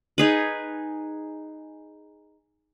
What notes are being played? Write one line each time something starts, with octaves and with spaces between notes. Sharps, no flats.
D#4 G#4 B4